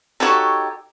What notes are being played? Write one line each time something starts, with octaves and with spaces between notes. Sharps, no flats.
D#4 F#4 G4 A4 C#5